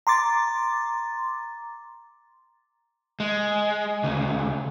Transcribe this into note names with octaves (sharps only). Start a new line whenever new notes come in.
A#5 C6 D6 A6
G#3
D2 C#3